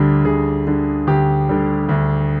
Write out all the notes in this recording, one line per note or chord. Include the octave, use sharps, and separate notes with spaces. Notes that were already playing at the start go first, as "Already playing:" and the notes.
Already playing: D2 D3 G3
D2 G#4
D3 G3
D2 G4
D3 G3
D2